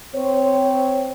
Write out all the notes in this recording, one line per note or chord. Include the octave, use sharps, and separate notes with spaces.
C4 C5 C#5